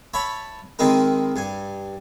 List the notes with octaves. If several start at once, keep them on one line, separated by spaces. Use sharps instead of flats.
C#5 E5 A5 B5
D#3 G#3 C4 D#4 E4 A#4
G2 G#5